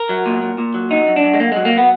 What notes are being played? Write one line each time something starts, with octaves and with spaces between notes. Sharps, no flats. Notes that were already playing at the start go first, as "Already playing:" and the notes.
Already playing: A#4
F#3
A#2
A#2
A#2
F#3
F#2 D#4
F#2
D4
F#2
G#3
F#2 A#3
F#3 G#3
A#3
F#3 B3